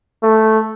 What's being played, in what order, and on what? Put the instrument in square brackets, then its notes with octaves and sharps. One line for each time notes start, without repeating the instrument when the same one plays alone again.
[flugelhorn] A3